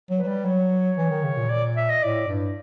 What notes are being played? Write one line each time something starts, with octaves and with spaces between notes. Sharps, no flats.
F#3
B4
F#3
G3
F#3 C#5
E3
D#3
C#3
A#2
D5
E5
D#5
A2 D5
G2